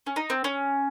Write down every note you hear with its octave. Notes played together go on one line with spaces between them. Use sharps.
C#4
D#4
C4
C#4